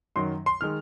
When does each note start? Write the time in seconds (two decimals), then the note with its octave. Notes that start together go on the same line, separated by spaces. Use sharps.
0.16 F#2 D#3 F#3 C6
0.46 C6
0.61 D#3 G#3 F6